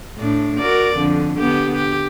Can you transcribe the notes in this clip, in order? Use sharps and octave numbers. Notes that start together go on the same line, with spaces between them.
A2 D4
F#4 A#4 D5
F2 D3
D3 B3 G4
G4